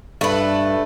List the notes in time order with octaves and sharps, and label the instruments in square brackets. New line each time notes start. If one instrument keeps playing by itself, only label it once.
[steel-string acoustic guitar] G2 [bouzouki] A3 B4